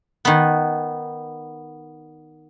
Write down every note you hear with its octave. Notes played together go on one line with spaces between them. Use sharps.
D#3 B3